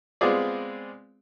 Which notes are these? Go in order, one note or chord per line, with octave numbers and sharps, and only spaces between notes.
G#3 B3 C4 F4 G#4 D5